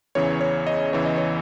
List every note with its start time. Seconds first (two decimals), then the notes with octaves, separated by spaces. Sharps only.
0.15 E2 C#3 E3 C#5
0.41 C#5
0.67 D#5
0.93 E2 C#3 E3 C#5
1.05 D#5
1.18 C#5